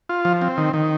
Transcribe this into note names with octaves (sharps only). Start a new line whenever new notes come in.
F4
F3
C4
D#3
D#3